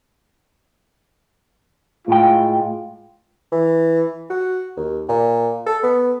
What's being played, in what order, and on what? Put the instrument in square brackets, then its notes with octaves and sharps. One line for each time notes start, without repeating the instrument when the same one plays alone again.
[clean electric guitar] A2 G5 [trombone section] G#3 F4
[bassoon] E3
F#4
D#2
A#2
A4
B3